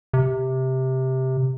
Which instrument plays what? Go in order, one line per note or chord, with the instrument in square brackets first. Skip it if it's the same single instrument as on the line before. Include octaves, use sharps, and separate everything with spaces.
[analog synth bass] C3